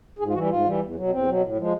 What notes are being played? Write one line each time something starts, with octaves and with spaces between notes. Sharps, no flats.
G#2 G#4
F4
E3 G3 F#4
G#2 F4
E3 G3
E2
B2 F#3
E2 C4
B2 F#3
A2
F3 G#3